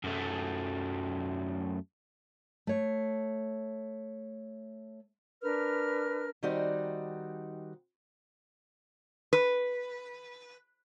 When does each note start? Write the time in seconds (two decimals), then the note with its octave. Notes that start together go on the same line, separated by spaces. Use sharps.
0.04 F#2 A3
2.67 A3 C#5
5.42 D4 A#4 B4 F6
6.43 D#3 G3 C4 D#4 F#4 D5
9.33 B4